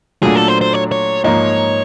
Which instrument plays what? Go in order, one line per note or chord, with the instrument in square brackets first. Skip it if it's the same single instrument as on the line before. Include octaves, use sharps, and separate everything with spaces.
[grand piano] A#2 F#3 A3 D4 F4 [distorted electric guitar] G#4
[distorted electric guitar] A4
C5
C5
C#5
C#5
[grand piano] G#2 F3 A#3 D#4 [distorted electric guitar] C#5